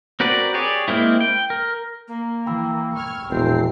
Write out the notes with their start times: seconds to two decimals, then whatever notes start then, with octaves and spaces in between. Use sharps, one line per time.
0.20 C4 F#4 A#4 B4 D5
0.54 G4 G#4 C#5 D5
0.88 G#3 A#3 C4 E4
1.20 G5
1.50 A#4
2.08 A#3
2.46 E3 G5 B5 E6
2.96 C#6 F6 G#6
3.29 E1 A#1 C4 A#4 C7